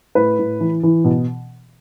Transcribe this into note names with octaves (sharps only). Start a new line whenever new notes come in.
A2 B4
A2
E3
E3
B2